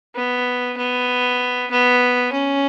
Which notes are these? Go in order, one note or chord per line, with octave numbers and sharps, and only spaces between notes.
B3
B3
B3
C#4